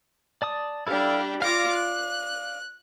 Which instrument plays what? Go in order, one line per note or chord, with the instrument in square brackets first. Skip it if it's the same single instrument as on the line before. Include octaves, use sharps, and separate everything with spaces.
[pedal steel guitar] D5 A5 D#6
[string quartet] G3 D4 G4 [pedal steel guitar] E4 A4 F5
[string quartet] F4 D6 A#6 [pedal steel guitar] D5 F5
[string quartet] F#6